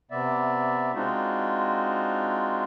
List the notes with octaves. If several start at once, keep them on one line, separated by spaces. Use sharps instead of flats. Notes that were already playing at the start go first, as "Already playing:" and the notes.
C3 B3 D5 E5
G#3 C4 D4 D#4 F4 F#4